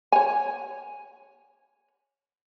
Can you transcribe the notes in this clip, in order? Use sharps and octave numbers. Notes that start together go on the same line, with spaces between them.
C#5 G#5